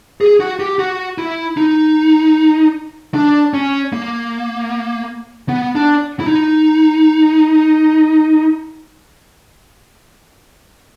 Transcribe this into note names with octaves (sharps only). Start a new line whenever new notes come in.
G#4
F#4
G4
F#4
E4
D#4
D4
C#4
A#3
B3
D4
E4
D#4